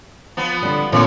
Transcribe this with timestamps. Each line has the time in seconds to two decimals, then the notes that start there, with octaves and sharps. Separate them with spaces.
0.37 F3 B3
0.62 D3 G3
0.92 A#2 D3 E3 C4 F4 C#5